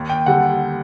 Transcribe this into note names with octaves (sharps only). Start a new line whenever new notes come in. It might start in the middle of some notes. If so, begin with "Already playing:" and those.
Already playing: D#2
G5
D3 G3 F#5